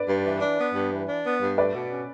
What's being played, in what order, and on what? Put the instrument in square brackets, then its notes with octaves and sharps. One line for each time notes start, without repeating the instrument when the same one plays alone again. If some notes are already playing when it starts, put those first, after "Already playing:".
Already playing: [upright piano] B4 D5
[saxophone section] G2
E3
D4
B3
G2
E3
D4
B3
G2
[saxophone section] A3 [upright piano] B4 D5
[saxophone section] B2
C#4